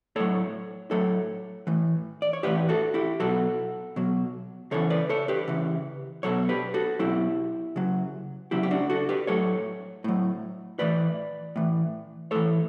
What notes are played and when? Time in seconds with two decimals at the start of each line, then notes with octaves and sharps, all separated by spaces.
0.16 A2 F#3 A4 C#5
0.91 A2 F#3 A4 C#5
1.67 A2 E3
2.22 D5
2.33 C#5
2.43 A2 E3 G4 B4
2.69 F#4 A4
2.94 E4 G4
3.20 B2 F#3 F#4 A4
3.96 B2 F#3
4.71 C#3 E3 A4 C#5
4.90 B4 D5
5.09 A4 C#5
5.28 G4 B4
5.48 C#3 E3
6.23 B2 F#3 A4 C#5
6.49 G4 B4
6.74 F#4 A4
6.99 B2 F#3 E4 G4
7.76 C#3 F#3
8.51 C#3 F#3 E4 G4
8.63 G4
8.71 D4 F#4
8.90 F#4 A4
9.09 G4 B4
9.27 A2 F#3 A4 C#5
10.04 A2 F#3
10.79 A2 E3 B4 D5
11.56 A2 E3
12.31 A2 E3 A4 C#5